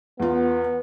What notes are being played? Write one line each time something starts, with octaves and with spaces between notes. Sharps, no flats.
E2 B3 F4